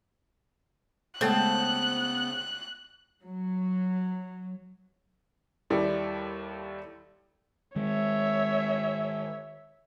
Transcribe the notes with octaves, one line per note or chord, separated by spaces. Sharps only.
C#3 G#3 A3 B3 C4 A4 A5 F#6
F#3
D#2 G3 E4 A4
D#3 G#3 C#5 E5